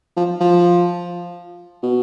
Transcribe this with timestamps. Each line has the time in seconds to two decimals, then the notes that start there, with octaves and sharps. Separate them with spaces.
0.17 F3
0.41 F3
1.83 B2